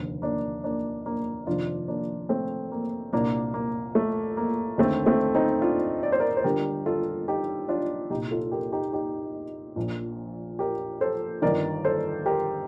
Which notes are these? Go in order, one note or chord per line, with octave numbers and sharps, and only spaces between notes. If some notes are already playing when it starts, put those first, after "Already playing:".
Already playing: F1 D#2 D3
A#3 D4
A#3 D4
A#3 D4
F1 F2 D#3 D4 F4
A#3 D4
A3 C4
A#3
C2 A#2 A#3 D4
A#3
A3
A#3
D#2 D3 A3 C4
A3 C4
C4 D#4
D4 F4
D5
C5
A#4 D5
C5
G1 G2 D3 G4 A#4
F4 A4
D#4 G4
D4 F4
C2 A#2 D#4 G4
F4 A4
G4 A#4
D#4 G4
D#4 G4
A#1 A#2
G4 A#4
A4 C5
G1 G2 D#3 A#4 D5
A4 C5
G4 A#4